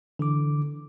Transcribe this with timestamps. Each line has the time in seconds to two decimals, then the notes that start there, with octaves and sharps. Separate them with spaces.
0.19 D3 E3 D6